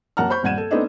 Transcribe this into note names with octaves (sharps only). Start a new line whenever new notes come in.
F#2 A#3 F#5 A5 A#5 F6
C5 B5 C#6 G6
D#1 G2 F#5 G#6 D#7 E7
A4
A3 B3 C4 D4 D#4